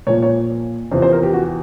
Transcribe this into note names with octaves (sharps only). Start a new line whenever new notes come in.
A#2 F3 A#3 C#5
C#5
E2 C3 F3 C5
C5
A#4
G4
F#4